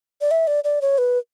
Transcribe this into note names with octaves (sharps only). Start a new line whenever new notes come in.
D5
E5
D5
D5
C#5
B4